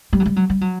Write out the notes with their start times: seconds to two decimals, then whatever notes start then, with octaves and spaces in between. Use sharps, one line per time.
0.13 G3
0.20 F#3
0.25 G3
0.36 F#3
0.50 G3
0.61 F#3